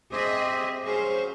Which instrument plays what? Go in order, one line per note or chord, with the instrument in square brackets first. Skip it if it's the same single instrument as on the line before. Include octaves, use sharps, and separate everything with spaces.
[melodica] C4 G4 [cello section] G#4 D#5 E5
[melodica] F#3 C#4 C#6 [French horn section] G#4 [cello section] C5 F5